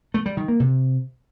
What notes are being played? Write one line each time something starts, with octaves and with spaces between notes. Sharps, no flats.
A3
G3
D#3
A#3
C3